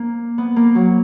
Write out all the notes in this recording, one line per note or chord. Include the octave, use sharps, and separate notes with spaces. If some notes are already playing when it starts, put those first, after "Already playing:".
Already playing: A#3
B3
A#3
F#3